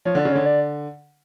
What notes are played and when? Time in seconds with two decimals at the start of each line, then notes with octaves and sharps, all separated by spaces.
0.05 F3 C#5
0.15 D3 D5
0.25 C#3
0.32 D3 C#5
0.46 D5